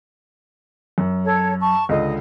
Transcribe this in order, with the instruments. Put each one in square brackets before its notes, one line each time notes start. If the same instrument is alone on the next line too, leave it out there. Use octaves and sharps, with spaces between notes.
[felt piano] F#2
[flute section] A4 C#5
A5 C#6
[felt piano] C#2 D3 [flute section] D#5